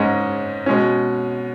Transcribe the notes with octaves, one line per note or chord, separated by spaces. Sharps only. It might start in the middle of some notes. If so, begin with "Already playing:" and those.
Already playing: G#2 G#3 C#4
B2 G#3 C#4